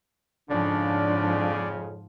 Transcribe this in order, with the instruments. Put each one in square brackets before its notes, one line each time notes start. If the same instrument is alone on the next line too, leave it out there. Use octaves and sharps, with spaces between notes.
[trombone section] F2 C#3 [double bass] G#2 F3 [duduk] D4 [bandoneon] D5